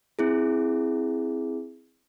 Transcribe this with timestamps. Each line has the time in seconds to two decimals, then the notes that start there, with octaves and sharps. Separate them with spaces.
0.19 C4 E4 G#4